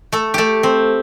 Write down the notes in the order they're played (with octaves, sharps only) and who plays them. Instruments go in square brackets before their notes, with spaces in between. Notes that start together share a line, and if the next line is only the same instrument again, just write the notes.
[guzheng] A3 A4
A3 G4 A4
C4